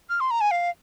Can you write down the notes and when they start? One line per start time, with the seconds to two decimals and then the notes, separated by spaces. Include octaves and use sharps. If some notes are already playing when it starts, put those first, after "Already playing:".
0.10 F6
0.20 C6
0.31 A#5
0.41 G#5
0.51 F5